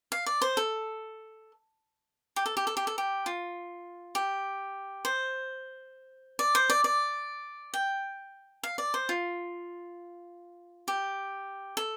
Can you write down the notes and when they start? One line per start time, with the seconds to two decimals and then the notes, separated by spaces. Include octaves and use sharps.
0.12 F5
0.26 D5
0.42 C5
0.57 A4
2.36 G4
2.46 A4
2.57 G4
2.67 A4
2.77 G4
2.87 A4
2.98 G4
3.26 F4
4.15 G4
5.05 C5
6.39 D5
6.55 C5
6.70 D5
6.84 D5
7.74 G5
8.63 F5
8.78 D5
8.94 C5
9.09 F4
10.88 G4
11.77 A4